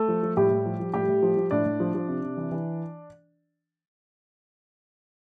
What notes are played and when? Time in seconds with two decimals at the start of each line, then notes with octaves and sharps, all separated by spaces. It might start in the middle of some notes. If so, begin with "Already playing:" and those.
Already playing: A3 A4
0.08 F3
0.23 F3
0.37 A2 G3 G4
0.51 A2
0.66 F3
0.80 F3
0.94 A2 G3 G4
1.08 A2
1.23 F3
1.37 F3
1.51 A2 D4 D5
1.66 A2
1.80 F3
1.95 F3
2.08 C3
2.23 C3
2.37 E3
2.52 E3